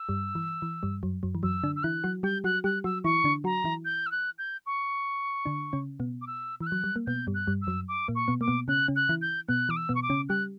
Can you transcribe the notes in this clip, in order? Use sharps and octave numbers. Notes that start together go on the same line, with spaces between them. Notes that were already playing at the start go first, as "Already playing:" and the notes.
Already playing: E6
G2 G3
E3
E3
G2 G3
F#2 F#3
F#2 F#3
E3
F#2 F#3 E6
D3 D4
E6
E3 E4 F#6
F#3 F#4
G3 G4 G6
F#3 F#4 F#6
G3 G4 F#6
F#3 F#4 E6
E3 E4 C#6
D3 D4
F#3 F#4 A#5
E3 E4
G6
E6
F#6
G6
C#6
D3 D4
C#3 C#4
B2 B3
D6
E6
E3 E6
F#6
F#3
G3
A#3
B2 B3 G6
G2 G3
F#6
G2 G3
E6
F#2 F#3
D6
A#2 A#3
C#6
B2 B3
A#3 D6
B2 B3
C#3 C#4 F#6
C#3 C#4
F#6
E3 E4
G6
B2 B3 F#6
E3 D6
E6
B2 B3
C#6
D6
C#3 C#4
G3 G4 F#6